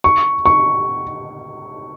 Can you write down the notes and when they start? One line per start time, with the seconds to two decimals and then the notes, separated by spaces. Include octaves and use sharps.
0.04 C#6
0.46 C#6